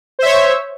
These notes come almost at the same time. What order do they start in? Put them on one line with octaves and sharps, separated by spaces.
C5 E5 C#5